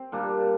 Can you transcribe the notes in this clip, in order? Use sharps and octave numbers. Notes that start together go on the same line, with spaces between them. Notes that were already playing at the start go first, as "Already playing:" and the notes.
Already playing: C4
A#2 G3 A#3 D4